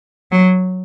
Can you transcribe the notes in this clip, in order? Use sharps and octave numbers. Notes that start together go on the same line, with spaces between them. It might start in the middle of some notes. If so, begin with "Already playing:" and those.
F#3